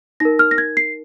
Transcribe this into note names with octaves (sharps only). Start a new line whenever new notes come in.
D#4 A#4 A#6
F6
A#6
G#6
C7